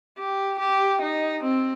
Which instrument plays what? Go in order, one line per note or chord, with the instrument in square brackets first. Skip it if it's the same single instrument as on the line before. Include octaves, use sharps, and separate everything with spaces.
[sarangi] G4
G4
D#4
C4